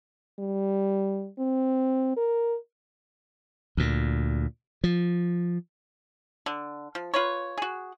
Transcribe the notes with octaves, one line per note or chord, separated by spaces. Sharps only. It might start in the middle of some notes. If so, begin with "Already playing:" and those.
G3
C4
A#4
D2 A#2
F3
D3
F3
F4 B4 C#5
F#4 G#4